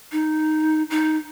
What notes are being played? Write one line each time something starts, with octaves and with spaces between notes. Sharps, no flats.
D#4
D#4